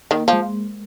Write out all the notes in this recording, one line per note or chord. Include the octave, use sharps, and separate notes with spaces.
D#3 A#3
F3
G#3